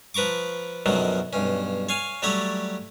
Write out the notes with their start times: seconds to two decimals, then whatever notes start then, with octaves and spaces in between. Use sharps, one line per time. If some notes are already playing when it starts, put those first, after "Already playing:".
0.14 F3 B4 A#5 C#6 D6
0.86 F#2 B2 D3 D#3 F3 F#3
1.33 B1 G2 C#4
1.89 C#5 F5 G#5
2.22 F#3 G3 A3 G4 C#5 D5